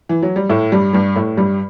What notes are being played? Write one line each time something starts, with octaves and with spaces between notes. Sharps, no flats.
E3
F#3
G3
A2 A3
G2 G3
G2 G3
A2 A3
G2 G3